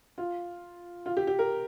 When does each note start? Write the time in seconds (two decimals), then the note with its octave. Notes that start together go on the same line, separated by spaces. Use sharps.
0.18 F4
1.06 F4
1.17 G4
1.27 G4
1.39 A#4